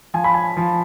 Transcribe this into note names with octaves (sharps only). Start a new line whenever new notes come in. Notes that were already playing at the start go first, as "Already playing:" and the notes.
F3 G#5
B5
G#5
F3